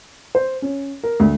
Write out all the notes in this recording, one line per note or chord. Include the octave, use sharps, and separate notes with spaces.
C5
C#4
A#4
D2